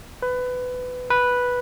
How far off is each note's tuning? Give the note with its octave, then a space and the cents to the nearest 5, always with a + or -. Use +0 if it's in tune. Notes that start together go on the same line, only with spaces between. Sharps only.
B4 +20
B4 -5